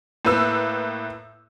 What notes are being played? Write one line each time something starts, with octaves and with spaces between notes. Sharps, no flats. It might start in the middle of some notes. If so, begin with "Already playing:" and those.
A2 A#3 B4 E6